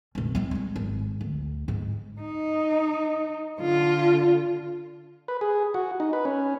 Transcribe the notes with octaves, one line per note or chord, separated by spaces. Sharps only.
F1 A#1
G3 C4
G2 G#3
G#1
D2
G#2
D#4
D3 F4
B4
G#4
F#4
D#4
B4
C#4